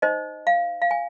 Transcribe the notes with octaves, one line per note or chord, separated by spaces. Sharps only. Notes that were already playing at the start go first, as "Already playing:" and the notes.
D#4 C5 D#5
F5
F5
G#5